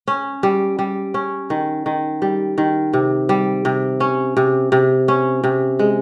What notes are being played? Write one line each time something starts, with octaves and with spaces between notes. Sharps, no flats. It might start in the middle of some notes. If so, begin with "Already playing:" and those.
C#4
G3
G3
C#4
D#3
D#3
G3
D#3
C3
G3
C3
C#4
C3
C3
C#4
C3
G#3